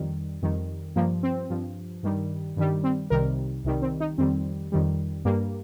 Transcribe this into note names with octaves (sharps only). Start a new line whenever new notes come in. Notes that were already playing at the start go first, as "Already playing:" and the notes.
Already playing: F2 D#3 G3
F2 D#3 G3
G2 F3 A#3
C4
G2 F3
G2 D#3 G3
G2 D#3 G3
C4
C2 C3 D#3 G3 A#4
C2 C3 D#3 G3
C4
D#4
F2 D#3 G3 C4
F2 D#3 G3
G2 G3 A#3